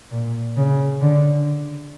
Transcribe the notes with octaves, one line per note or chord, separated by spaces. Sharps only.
A#2
C#3
D3